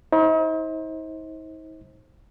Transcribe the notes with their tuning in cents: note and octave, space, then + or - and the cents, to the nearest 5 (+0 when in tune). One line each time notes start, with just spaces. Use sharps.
D#4 +45 C5 +25